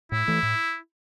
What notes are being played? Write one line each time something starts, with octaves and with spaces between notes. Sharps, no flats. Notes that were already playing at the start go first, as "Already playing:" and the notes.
A2 E4
E3 A3
A2